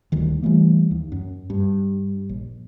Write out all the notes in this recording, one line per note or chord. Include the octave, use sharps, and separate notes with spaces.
D#1 D2 D#3
E3 G3 A3 A#3
D#2
F#2
G2
A#1